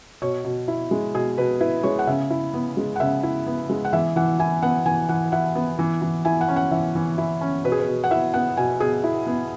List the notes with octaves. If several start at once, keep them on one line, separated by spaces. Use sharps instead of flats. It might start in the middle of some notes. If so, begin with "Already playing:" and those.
B2 C#5
B2
E4
G#3
B2 G#4
B2 B4
E4 B4
G#3 C#5
F#5
C#3 E5
E4
B3
G#3
F#5
C#3 E5
E4
B3
G#3
F#5
E3 E5
E3 F#5
E4 G#5
B3 F#5
E3 G#5
E3 F#5
E4 F#5
B3
E3
E3
E4 G#5
F#5
C#4
F#5
E3 E5
E3
E4
C#4
B2 B4
G#4
B4
B2
F#5
E4 E5
B3 F#5
B2 G#5
B2 G#4
E4
B3